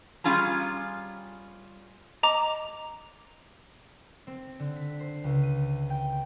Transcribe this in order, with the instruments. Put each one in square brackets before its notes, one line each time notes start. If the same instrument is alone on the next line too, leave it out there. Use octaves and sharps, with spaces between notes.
[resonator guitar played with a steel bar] G3 C#4 F4 G#4 A#5
[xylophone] D#5 A#5 D6
[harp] C4
D3
B6
C5
C#2
D#7
G5